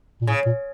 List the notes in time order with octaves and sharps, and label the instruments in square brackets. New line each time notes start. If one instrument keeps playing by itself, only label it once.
[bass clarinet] A#2
[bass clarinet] A2 [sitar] C#3
[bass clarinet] A#2